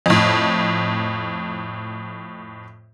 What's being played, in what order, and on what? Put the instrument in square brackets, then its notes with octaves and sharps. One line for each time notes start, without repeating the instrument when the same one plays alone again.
[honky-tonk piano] F2 A2